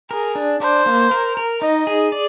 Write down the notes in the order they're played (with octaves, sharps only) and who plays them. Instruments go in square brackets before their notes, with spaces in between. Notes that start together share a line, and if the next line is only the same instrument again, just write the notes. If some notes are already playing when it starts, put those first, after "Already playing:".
[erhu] G#4 [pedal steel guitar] A#4
[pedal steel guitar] D4
[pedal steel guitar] D4 [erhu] C5
[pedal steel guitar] A#3
A#4
A#4
[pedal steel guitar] D#4 [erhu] D#5
[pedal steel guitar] G#4
D5